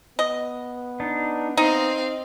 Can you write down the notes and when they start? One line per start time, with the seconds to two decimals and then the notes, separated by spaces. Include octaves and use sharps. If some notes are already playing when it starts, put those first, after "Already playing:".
0.19 B3 D#5
1.00 D4 D#4
1.57 C4 D#4 D#5 F5